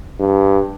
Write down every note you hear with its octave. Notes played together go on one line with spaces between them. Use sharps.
G2